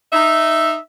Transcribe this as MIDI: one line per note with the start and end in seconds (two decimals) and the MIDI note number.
0.12 0.76 63
0.12 0.76 76